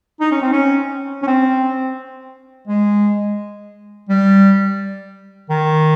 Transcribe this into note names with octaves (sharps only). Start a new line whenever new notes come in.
D#4
C#4
C4
C#4
C#4
C4
G#3
G3
D#3